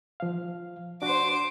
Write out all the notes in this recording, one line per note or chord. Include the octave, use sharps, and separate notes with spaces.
F3 F5
D4 F#4 C5 D6